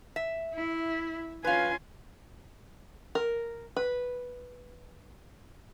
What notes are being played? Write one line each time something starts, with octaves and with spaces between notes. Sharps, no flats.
E5
E4
C#4 F4 B4 F5 G#5
A#4
B4